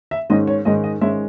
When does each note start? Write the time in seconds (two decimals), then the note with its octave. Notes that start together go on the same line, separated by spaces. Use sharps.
0.11 E5
0.30 G#2 D#3 G#3 C#4 D#5
0.47 C#5
0.65 G#2 D#3 G#3 C#4 D#5
0.84 D#5
1.01 G#2 D#3 G#3 C#4 E5